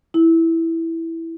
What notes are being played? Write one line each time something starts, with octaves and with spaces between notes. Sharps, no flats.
E4